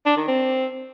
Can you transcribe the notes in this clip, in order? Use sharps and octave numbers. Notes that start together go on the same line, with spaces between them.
D4
D#3
C4